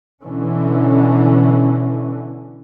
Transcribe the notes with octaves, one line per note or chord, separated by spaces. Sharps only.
B2 D3 E3 C#4